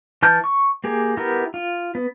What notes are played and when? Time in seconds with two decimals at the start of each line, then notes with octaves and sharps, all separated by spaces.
0.23 E3 A5 F6 G6
0.44 C#6
0.84 A#3 G4 G#4
1.17 B3 E4 G4 A#4
1.54 F4
1.95 B3